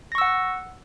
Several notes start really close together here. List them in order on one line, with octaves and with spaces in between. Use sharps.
A#6 C#6 E6 F#5